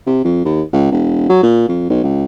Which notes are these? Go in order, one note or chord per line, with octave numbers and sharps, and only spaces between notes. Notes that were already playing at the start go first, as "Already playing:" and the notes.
C3
F2
D#2
C#2
E1
F#3
A#2
F2
B1
C#2